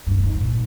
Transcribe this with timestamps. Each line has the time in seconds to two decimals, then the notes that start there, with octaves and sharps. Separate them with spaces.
0.07 G2
0.18 G2
0.24 G#2
0.41 A#2